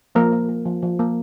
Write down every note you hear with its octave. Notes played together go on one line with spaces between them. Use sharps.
F3 A#3 A#4
A#3
A#3
F3
F3
A#3